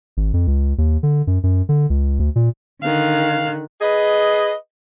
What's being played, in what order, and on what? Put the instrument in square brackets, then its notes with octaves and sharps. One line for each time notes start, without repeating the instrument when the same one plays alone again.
[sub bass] G#1
F2
C#2
D#2
D3
F#2
F#2
D3
C#2
D2
A#2
[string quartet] D3 D#3 F#6 [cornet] F5
[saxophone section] G#4 B4 D#5